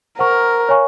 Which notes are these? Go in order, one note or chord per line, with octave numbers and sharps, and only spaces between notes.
A#4 C5 F#5 A#5 C#6
C#5 F5 G#5 C#6